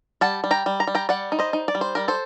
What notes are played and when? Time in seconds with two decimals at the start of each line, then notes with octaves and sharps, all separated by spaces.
0.21 G3 F#5 A5
0.44 G3
0.51 G5 A#5
0.66 G3
0.80 A#5
0.87 G3
0.95 G5 A#5
1.09 G3 D5 F#5
1.32 D#4
1.39 C5 D#5
1.53 D#4
1.68 D5
1.75 G3
1.81 C5
1.95 G3 A#4
2.08 A4 C5